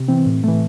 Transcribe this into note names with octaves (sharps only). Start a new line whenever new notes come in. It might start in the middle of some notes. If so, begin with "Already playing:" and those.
Already playing: C3
E3 C4
A2
E3 A3